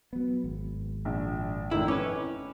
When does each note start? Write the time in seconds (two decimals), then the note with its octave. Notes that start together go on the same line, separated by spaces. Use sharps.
0.13 F#3 B3
0.44 G#1
1.05 A#1
1.71 F1 D#3 E4
1.88 C#4 B4 D6